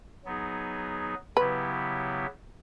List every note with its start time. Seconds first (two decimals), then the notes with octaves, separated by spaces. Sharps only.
0.25 F#3 B3 D#4 G#4
1.37 C#3 F#3 B3 E4 G4 B4